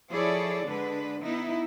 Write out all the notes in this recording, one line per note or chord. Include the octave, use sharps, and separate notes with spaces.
F3 E4 G#4 A4 C#5 D5
D3 G#3 D4 B4
B3 D#4 E4